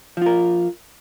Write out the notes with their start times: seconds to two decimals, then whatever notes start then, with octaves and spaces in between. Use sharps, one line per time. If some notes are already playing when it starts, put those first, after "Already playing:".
0.17 F3
0.22 F4
0.26 A#4